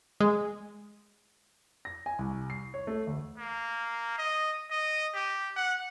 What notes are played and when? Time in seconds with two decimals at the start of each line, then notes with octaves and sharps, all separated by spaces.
0.20 G#3
1.85 A#6
2.06 G#5
2.19 C2
2.50 C7
2.74 C#5
2.87 A3
3.07 D2
3.38 A#3
4.18 D#5
4.71 D#5
5.15 G4
5.56 F#5